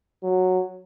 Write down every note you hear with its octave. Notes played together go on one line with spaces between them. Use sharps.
F#3